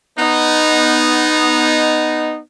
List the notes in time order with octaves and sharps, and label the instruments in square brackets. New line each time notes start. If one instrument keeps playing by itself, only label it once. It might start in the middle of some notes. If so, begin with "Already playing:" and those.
[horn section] B3 D#4